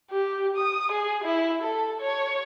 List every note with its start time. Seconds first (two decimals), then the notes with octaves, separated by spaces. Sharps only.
0.11 G4
0.56 D#6
0.92 G#4
1.24 E4
1.62 A4
2.01 C#5